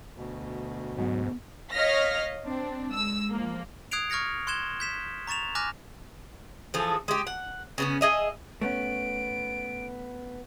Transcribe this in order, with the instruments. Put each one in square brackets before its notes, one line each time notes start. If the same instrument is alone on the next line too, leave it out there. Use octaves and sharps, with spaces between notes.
[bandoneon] D2 B2
[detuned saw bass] G#2 [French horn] F#3 [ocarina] B3
[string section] C#5 D#5 F5 F6 A#6 B6
C4 D4
G#3 E6
F3 A#3
[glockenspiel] D#6 F#6 G#6 C7 D7 F7
C#6 F6 G#6 A#6 C#7
C6 F#6 G#6 E7 G7
G6 B6 E7
A#5 C#6 A6 E7 F7
G#5 D6 F6 F#6 A#6
[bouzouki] E3 F3 G#4 A4
G#3 G4
F#5
C#3 B3 C#4
G#4 D#5 E5
[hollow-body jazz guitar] A3 B3 C#4 [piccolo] D7